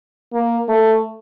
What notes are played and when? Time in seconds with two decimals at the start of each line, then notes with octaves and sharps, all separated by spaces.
0.33 A#3
0.69 A3